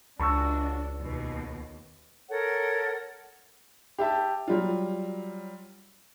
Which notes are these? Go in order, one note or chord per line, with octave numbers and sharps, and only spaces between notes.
C#2 D4 F#4 A5 C#6 E6
D#2 B2
A4 A#4 C#5 F#5
G4 E5 A5
F#3 G3 F4